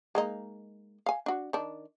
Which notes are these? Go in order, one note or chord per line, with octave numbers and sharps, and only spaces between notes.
G#3 A#3 D#4
F5 G#5
D4 F#4
D#3 D4